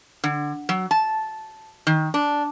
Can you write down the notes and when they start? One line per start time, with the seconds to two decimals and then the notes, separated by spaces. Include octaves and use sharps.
0.24 D3
0.69 F#3
0.91 A5
1.87 D#3
2.14 D4